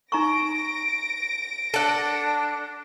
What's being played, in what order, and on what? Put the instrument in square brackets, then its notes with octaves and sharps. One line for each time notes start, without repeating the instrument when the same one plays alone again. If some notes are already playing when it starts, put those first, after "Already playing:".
[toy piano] D#4 A#5 C#6 [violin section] A#6 D7
[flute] D4 [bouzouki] A4 F#5